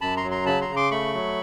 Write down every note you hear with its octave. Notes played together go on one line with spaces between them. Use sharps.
F#2 A5 B5
A#5 C6
F#3
A#5 C6
C#3 A5 B5
A#5 C6
C#3
C6 D6
A3 B5 C#6
F#3